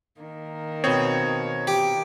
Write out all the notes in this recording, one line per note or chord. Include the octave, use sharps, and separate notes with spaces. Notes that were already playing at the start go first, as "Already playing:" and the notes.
D#3 A#3
B2 C4 C#5 D#6
G4